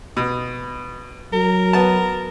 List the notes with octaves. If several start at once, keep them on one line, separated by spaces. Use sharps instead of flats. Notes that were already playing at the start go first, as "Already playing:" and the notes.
B2
F#3 A#4
B3 A5